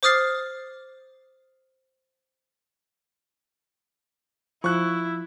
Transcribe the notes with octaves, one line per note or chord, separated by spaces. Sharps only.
C5 D6 D#6 F6 A6 C7
F3 E4 C#6 F#6